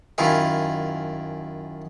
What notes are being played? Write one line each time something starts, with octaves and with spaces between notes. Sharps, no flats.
F#2 D#3 E4 F4 G#5